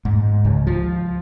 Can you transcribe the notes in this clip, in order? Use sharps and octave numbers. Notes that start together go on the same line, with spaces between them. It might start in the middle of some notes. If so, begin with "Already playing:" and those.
G#2
C#2
F3